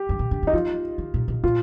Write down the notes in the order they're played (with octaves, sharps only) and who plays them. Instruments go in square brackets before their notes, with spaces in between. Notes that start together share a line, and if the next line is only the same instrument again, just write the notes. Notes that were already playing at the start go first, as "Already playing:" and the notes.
Already playing: [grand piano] G4
[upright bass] G2
A#2
D3
D#3
[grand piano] D#4
[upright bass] F3 [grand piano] F4
[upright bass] D#3
A#2
A#2
[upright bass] A#2 [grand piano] F4